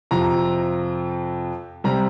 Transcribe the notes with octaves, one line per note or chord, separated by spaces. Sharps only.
F2 C3 F3 A#5
C3 G3 A#5